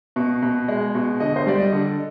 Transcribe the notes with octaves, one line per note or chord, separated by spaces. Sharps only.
B2
B2
G#3
B2
D3 D#5
C5
G3 D5
D#5
D3